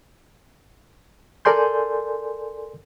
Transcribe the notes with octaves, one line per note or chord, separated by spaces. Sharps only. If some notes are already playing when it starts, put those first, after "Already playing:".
A4 A#4 D5 G#5 C6 G6